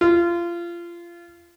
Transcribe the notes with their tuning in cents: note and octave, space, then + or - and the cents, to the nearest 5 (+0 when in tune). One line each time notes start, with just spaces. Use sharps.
F4 -25